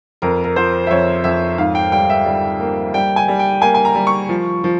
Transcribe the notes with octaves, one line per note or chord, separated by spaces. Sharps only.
F2 A#4
A#4
F3 C5
E5
F2 C#5
F2 E5
G#2 F5
G5
G3 G5
E5
G3
A#3
G3 G5
G#5
G3
G5
A#3 G#5
G#5
A#5
G3
C#6
F3
F3